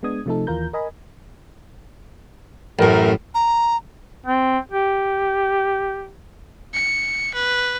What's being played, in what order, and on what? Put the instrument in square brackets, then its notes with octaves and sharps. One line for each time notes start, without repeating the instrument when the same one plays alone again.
[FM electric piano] G#3 B3 D4 D#6 G#6
C3 F3 A3 C4 D#4 A4
D#2 E3 F4 A#4 A#5 G6
A#4 D#5 G#5 B5
[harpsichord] A1 F#2 [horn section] A3 A#4
[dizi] A#5
[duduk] C4
G4
[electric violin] C#7
B4